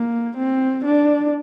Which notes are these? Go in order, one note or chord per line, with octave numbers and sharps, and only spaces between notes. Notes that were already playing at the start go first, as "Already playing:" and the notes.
Already playing: A#3
C4
D4